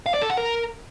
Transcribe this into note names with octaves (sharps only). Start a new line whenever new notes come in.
F5
D5
A4
F#5
A#4